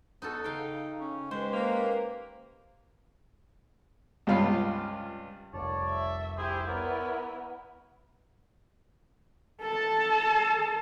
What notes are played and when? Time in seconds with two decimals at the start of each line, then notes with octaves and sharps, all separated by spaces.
0.22 E2 D#4 F#4 A4
0.44 C#3 D#4 F5 G5
1.00 C#4
1.31 G#3 C#4 G4 B4 C5
1.53 A#3
4.27 C#2 G2 C3 F4 F5 B5
5.54 F1 C2 C#5 D5 A5
5.90 E5
6.38 E4 G4 G#4 C5
6.68 B3 E4 A#4 C#5 D5
9.62 A4 A5